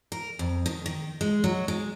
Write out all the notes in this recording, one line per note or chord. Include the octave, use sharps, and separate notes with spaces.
A#4
F2
D#3
D#3
G#3
F#3
G#3